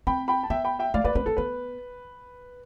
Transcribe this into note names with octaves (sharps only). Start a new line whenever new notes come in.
C4 G5 B5
G5 B5
A5
B3 E5 G5
G5 B5
E5 G5
A3 D5 F5
A3 B4 D5
C4 B4
C4 A4
B3 B4